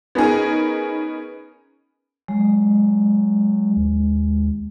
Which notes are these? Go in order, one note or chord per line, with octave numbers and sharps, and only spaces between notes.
B3 C#4 D#4 G#4 A#4
F#3 G#3
D#2